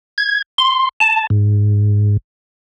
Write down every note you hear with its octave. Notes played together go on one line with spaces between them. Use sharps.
G#6
C6
A5
G#2